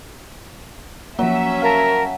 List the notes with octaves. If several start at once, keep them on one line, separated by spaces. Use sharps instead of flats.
F3 F#3 A#3 C#4 E5
A#4 F5 A5